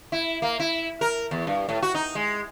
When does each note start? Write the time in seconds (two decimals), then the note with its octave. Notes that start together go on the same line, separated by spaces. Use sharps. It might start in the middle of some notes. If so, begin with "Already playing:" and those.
0.12 E4
0.42 A#3
0.60 E4
1.01 A#4
1.31 E2
1.47 G2
1.69 A2
1.82 F#4
1.95 D#4
2.15 G#3